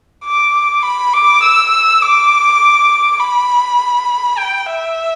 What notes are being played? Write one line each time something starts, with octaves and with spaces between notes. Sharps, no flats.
D6
B5
D6
E6
D6
B5
G5
E5